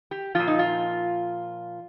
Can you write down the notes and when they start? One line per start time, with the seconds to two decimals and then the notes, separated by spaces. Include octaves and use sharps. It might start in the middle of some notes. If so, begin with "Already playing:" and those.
0.11 G4
0.35 A#2 F3 F4
0.47 D#4
0.59 F4